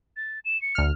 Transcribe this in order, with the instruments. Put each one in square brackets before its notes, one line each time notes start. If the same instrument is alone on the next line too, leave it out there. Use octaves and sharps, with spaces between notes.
[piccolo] A6
E7
C#7
[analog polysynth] D2 F6